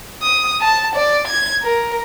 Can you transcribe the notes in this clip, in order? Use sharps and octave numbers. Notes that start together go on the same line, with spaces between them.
D#6
A5
D5
G#6
A#4